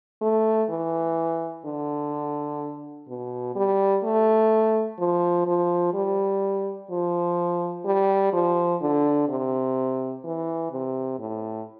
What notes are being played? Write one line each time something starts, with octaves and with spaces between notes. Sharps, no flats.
A3
E3
D3
B2
G3
A3
F3
F3
G3
F3
G3
F3
D3
C3
E3
C3
A2